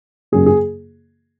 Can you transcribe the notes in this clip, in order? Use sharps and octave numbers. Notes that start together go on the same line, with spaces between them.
F#2 C#3 F#3 A#3 G#4
G#4